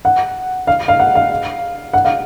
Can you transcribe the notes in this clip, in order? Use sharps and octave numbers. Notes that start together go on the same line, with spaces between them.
F#5
F5
F5
F#5
F5
F#5
F5